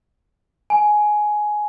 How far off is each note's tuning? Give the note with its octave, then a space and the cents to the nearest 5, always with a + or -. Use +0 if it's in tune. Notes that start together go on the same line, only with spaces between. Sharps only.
G#5 +15